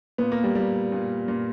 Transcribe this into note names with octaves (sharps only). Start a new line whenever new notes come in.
A#2 B3
A#3
G3
A#2 G3
A#2
A#2